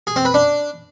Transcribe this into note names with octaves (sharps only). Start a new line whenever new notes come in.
G#4
C4
B4
D4